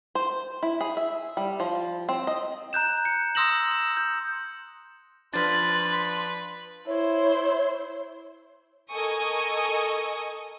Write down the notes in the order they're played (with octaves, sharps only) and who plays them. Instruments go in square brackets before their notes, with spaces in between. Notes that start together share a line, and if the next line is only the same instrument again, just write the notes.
[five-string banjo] C5
E4
G#4
E5
G3
F3
C4
D#5
[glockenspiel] A#5 F#6 G6 E7
C#7
C6 D#6 E6 A#6 E7 F#7
E7
G6
[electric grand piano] F3 D4 [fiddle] B4 [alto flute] C6 [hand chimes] F6 F#6 A6
[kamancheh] E4 C5 [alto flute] C#5
[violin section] A4 A#4 D#5 G#5 C#6 D#6